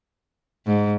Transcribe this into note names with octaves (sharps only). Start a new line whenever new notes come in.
G#2